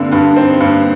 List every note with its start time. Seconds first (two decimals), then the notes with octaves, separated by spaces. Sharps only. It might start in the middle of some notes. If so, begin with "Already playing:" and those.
Already playing: G2 D3 A#3 C4 D4
0.12 G2 D4
0.37 C4 D#4
0.60 G2 D4